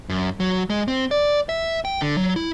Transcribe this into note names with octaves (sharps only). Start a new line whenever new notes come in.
F#2
F#3
G#3
C4
D5
E5
G5
D3
F#3
E4